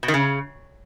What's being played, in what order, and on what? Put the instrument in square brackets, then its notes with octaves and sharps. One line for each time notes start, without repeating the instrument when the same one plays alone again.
[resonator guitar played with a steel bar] B2
D#3
C#3